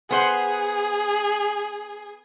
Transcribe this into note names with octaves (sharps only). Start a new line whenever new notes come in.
B3 G#4 C5 F#5